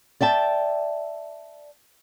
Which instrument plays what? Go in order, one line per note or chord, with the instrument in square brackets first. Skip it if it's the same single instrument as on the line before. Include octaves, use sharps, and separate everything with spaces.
[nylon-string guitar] D5 E5 G5 A5